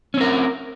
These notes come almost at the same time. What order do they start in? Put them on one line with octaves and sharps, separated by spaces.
C#4 C4 A#4